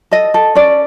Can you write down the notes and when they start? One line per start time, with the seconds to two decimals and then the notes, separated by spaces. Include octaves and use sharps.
0.11 A4 D#5
0.34 A4
0.55 C#4 D5